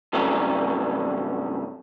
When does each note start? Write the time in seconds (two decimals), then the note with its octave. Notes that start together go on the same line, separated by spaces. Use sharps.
0.13 G2 C3 F#3 A3 C#4